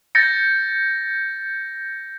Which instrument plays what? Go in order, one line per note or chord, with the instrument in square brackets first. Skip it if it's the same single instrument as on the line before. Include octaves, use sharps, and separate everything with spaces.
[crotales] G6 A6 A#6 C#7